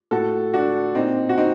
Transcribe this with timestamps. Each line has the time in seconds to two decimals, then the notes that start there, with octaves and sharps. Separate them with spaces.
0.11 A2 F#4 A4
0.54 D4 F#4
0.95 A#2 C4 D#4
1.29 F#4
1.38 C4 D#4